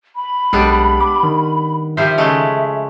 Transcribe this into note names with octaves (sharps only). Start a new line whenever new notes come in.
B5
B1 G3 G#3 B3 D4
D6
D#3
F3 G3 C5 E5
C#3 G#3 A3 E5